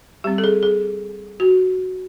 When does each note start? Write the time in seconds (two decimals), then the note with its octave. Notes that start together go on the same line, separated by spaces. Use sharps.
0.24 G3 C4 G4
0.38 A4
0.44 G#4
0.63 G#4
1.40 F#4